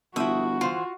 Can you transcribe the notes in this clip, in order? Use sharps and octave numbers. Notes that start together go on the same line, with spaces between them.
G1 F3 E4 F#4 E5 D#6
E3 F4 C5 F#5